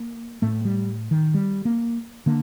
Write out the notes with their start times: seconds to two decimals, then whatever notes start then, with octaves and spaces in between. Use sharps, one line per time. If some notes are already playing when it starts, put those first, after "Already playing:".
Already playing: A#3
0.42 A2 A3
0.65 G3
1.11 D#3
1.34 G3
1.65 A#3
2.26 D3 A#3